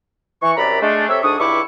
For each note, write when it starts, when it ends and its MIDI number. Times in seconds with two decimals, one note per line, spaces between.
0.42 0.52 52
0.42 0.52 85
0.57 0.81 36
0.57 0.81 42
0.57 0.81 74
0.57 0.81 82
0.57 0.81 83
0.82 1.08 56
0.82 1.08 57
0.82 1.08 62
1.09 1.19 48
1.09 1.19 60
1.09 1.19 69
1.09 1.19 73
1.09 1.19 76
1.09 1.19 88
1.23 1.39 38
1.23 1.39 44
1.23 1.39 62
1.23 1.39 85
1.23 1.39 87
1.39 1.61 37
1.39 1.61 43
1.39 1.61 64
1.39 1.61 76
1.39 1.61 85
1.39 1.61 86